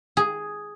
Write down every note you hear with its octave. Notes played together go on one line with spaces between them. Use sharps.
G#4